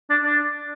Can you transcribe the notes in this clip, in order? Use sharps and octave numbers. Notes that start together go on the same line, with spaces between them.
D4
D4